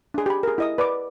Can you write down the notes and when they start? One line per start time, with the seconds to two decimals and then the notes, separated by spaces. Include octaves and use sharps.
0.14 D4 G#4
0.26 G4 B5
0.43 G#4 A#4
0.58 E4 D#5 D#6
0.78 B4 D5 B5 D6